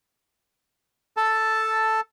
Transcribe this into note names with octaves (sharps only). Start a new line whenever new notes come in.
A4 A5